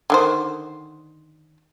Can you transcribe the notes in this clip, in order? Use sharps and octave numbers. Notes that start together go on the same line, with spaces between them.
D3 D#3 C5